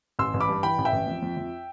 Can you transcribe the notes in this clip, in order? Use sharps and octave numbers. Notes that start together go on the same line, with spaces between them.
A1 C6 E6
A1
B5 D6
G2
E3 G5 B5
A1
E5 G5
A1
F2
F2
F2